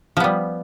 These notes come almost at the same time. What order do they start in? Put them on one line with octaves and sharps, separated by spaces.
F3 B3 G3